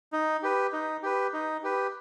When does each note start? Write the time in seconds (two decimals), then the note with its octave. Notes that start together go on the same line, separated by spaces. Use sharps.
0.13 D#4
0.43 G4 B4
0.73 D#4
1.03 G4 B4
1.33 D#4
1.63 G4 B4